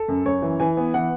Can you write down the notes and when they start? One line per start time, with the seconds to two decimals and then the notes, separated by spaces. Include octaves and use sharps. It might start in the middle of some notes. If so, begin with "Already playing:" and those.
Already playing: A4
0.08 F#2
0.25 F#2 C#5
0.42 E3
0.60 E3 G#5
0.77 B3
0.94 E3 F#5